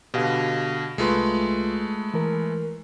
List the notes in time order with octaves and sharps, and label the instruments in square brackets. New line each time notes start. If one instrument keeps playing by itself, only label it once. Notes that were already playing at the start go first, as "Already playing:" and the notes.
[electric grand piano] B2 D3 [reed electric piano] G4 F5
[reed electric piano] C2 F4 C6 [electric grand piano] G#3 A3 B4
[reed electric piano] E3 A#4